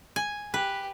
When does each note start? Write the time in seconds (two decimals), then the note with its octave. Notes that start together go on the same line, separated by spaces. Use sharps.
0.16 G#5
0.54 G4 B4